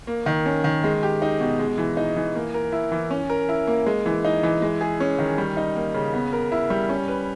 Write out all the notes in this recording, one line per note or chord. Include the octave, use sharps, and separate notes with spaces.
A#3
D#3
C#4
D#3
G#3
G4
D#4
B2
G#3
E3
D#4
E3
A#3
A#4
E4
E3
C#4
A#4
E4
A#3
G#3
E3
D#4
E3
G#3
G#4
C#4
D#3
G3
D#4
A#3
C#3
B3
A#4
E4
G3
C#4
B4